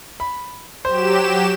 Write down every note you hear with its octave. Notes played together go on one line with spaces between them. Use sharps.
B5
F#3 G4 C5 E7